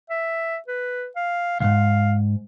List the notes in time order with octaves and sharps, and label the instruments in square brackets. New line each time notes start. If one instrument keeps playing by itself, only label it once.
[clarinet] E5
B4
F5
[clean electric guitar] C2 G#2 [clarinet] F5